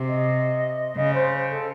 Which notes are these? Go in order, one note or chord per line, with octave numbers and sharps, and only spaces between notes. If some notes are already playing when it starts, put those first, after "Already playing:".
Already playing: C3
D#5
C#3 D#5
C5
A4